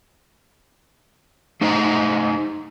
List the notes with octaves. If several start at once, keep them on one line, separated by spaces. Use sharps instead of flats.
A3 D#4 C5 D#5 A#5